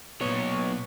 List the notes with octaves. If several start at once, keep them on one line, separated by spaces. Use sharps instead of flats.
B1 A#2 B3 C#5